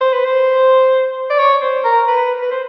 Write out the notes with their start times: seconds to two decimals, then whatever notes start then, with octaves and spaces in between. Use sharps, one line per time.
0.01 C5
0.13 B4
0.25 C5
1.30 D5
1.38 C#5
1.62 C5
1.85 A#4
2.08 B4
2.42 B4
2.51 C5